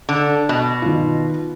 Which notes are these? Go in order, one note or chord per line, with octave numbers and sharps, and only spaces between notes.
D3
B2
D#3 F4